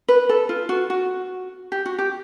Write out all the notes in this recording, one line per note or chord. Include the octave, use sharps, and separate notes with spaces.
B4
A4
F4
F#4
F#4
G4
F#4
G4